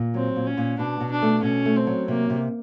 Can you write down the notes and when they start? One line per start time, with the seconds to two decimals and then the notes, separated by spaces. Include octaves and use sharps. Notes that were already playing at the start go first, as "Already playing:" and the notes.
Already playing: A#2
0.14 F#3 C4
0.36 A#2
0.47 C#4
0.57 A#2
0.79 B2 D4
1.00 B2
1.12 D4
1.22 A3
1.43 B2 C#4
1.66 A3
1.76 C4
1.87 F#3
2.08 C3 A#3
2.30 C3